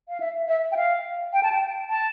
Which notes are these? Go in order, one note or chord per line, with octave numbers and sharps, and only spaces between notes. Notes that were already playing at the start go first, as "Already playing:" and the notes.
F5
E5
E5
G5
F5
G5
A5
G5
A5